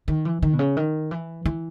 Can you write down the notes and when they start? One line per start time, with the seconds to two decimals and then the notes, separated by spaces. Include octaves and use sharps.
0.08 D#3
0.25 E3
0.43 D#3
0.53 B2
0.59 C#3
0.77 D#3
1.11 E3
1.46 E3